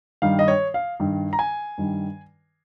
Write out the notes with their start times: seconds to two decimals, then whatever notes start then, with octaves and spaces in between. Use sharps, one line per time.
0.22 G2 D#3 G3 F5
0.39 D#5
0.48 C#5
0.74 F5
1.00 G2 D#3 G3
1.33 A#5
1.39 G#5
1.78 G2 D#3 G3